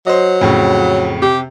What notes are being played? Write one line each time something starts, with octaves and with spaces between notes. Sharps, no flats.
F#3 C5 D#5
F2 A2 C#3
C3 G4